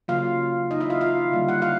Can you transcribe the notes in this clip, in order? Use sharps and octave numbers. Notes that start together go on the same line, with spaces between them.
C#3 F#3 A#3 F4 F5
D#4 D#5
E4 E5
F4 F5
F4 F5
D3 G3 A#3
F#5
F4 F5